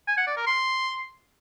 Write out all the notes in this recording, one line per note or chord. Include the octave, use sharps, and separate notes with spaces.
G#5
F#5
D5
A#4
C6